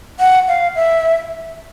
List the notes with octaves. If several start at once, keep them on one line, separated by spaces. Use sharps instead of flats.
F#5
F5
E5